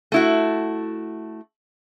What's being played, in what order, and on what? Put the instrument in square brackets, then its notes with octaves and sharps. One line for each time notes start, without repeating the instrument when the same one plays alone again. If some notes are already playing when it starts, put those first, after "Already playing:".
[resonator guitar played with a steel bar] A3 E4 F#4